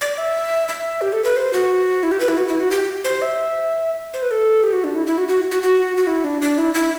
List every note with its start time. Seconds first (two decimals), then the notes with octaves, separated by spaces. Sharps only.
0.01 D5
0.18 E5
0.69 E5
1.01 G4
1.12 A4
1.24 B4
1.36 C5
1.53 F#4
2.03 E4
2.11 G4
2.20 B4
2.28 E4
2.37 F#4
2.48 E4
2.60 F#4
2.71 G4
3.04 C5
3.22 E5
4.14 C5
4.22 B4
4.31 A4
4.63 G4
4.73 F#4
4.84 D4
4.95 E4
5.07 E4
5.18 F#4
5.28 F#4
5.51 F#4
5.63 F#4
5.97 F#4
6.07 E4
6.24 D4
6.42 D4
6.58 E4
6.74 E4